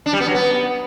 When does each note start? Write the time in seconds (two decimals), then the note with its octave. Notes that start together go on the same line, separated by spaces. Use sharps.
0.06 D4
0.13 G3
0.20 B3
0.27 F#3
0.34 B3